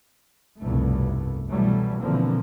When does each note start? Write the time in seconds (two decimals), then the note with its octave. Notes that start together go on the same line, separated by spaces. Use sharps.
0.60 F1 C2 G2 B2 A3
1.50 B2 E3 F#3 G3 A3
2.00 B2 D3 E3 F3 A#3 C4